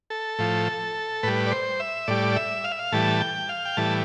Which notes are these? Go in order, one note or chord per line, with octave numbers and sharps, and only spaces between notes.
A4
A2 F3
A2 G3 B4
D5
C5
E5
A2 G3 D5
E5
F5
E5
F5
A2 E3 G3 A5
G5
F5
G5
A2 E3 G3 A5